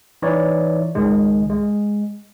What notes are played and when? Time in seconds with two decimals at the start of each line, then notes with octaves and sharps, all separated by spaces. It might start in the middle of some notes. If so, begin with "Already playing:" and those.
0.22 E3 D#4 E4 C#5 D5
0.95 C#2 G#2 D#3 G#3
1.50 G#3